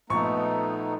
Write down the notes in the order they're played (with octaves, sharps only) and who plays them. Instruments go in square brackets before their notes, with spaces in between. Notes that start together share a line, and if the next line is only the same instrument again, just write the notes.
[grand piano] A#1 C#6 [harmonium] A3 B3 D#4